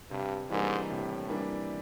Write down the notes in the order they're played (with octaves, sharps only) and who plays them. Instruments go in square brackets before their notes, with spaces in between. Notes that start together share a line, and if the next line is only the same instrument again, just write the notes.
[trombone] G2 [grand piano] C3
[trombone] G#2 [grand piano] E3 G3 A#3 D4
[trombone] A2 [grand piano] C3
[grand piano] E3 G3 A#3 D4